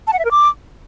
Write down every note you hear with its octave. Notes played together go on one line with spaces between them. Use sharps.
A5
F#5
E5
A#4
D6